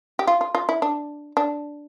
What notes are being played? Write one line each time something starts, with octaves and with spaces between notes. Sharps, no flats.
G4
F4
F4
F4
E4
D4
D4